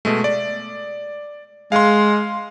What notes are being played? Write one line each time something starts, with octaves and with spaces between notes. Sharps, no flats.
B2 G#3 A3
D5
G#3 F5 C6